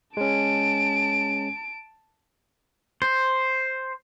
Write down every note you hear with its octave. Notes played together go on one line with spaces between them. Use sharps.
G#3 C#4 A5 D7
C5